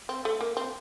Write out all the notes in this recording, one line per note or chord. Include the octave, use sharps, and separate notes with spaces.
C4
A3
A#3
C4